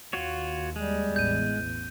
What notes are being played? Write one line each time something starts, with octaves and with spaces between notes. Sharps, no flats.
D#2 F4 F#4 C#5
G3 G#3
A1 E2 G6 D#7